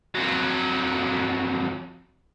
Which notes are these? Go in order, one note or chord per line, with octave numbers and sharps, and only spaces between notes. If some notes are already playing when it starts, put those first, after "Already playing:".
F2 F#3